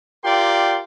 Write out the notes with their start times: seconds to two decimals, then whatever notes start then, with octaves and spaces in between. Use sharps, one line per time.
0.24 F4 G4 A#4 D5 G5 C6